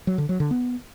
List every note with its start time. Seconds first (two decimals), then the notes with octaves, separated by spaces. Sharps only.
0.07 F#3
0.18 D3
0.29 F#3
0.40 D3
0.51 B3